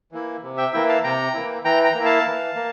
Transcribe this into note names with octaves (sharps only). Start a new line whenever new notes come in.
E3 A#3 E4
C3
E5 G5
E3 A#3 E4 E5 G5
F5 A5
C3 G5 A#5
E3 A#3 E4
E3 G5 A#5
G5 A#5
A#3 E4
F5 A5
E3
A#3